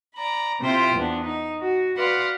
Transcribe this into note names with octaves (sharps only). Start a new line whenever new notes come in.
D5 A#5 B5
C3 C4 E4 F4 C5 G5
E2 B3 D4
D#4
F#4
F#4 B4 D5 F5 F#5 C6